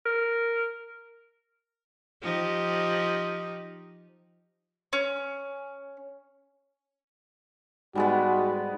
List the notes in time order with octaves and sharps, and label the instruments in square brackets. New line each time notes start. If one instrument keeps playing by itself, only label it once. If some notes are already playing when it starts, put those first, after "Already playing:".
[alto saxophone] A#4
[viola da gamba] F3 D#4 G4
[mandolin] C#4
[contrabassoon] G#2 [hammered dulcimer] G3 G#3 B3 [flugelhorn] F#4